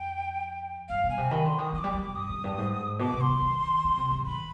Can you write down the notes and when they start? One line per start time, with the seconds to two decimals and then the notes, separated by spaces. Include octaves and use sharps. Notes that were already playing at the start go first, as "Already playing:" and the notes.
Already playing: F2 G5
0.89 G2 F5
1.04 B2
1.10 G#5
1.18 C3
1.31 D#3 B5
1.45 D3 C6
1.58 D#3 D#6
1.73 F3 D#6
1.79 D6
1.84 G3
1.94 G3
2.05 B2
2.15 G2 D#6
2.29 F2
2.44 G2
2.58 G#2
2.99 B2 D6
3.14 C3
3.21 C6
3.28 D#3
3.42 D#3
3.85 D3
3.97 C3
4.11 G#2
4.26 D#3 B5